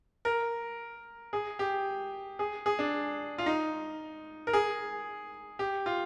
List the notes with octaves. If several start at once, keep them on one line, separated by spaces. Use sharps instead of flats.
A#4
G#4
G4
G#4
G#4
D4
F4
D#4
A#4
G#4
G4
F4